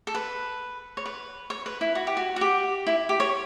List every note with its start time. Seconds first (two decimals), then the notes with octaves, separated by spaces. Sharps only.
0.07 A4
0.15 B4
0.97 C#5
1.06 B4
1.50 C#5
1.66 B4
1.81 E4
1.95 F#4
2.07 G4
2.17 F#4
2.36 F#4
2.41 G4
2.87 E4
3.09 G4
3.20 C#5